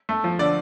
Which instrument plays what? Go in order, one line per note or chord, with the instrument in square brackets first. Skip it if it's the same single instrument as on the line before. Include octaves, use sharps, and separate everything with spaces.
[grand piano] A3
F3
D3 D5